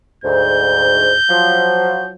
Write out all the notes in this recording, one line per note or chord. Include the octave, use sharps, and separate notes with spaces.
D2 G#2 G6
F3 F#3